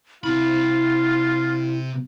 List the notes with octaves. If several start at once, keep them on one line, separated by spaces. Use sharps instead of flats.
C3 E4 F4 B5